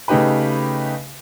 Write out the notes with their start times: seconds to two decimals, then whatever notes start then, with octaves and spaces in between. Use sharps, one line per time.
0.08 C#3 A3 D#4 G4 B4 B5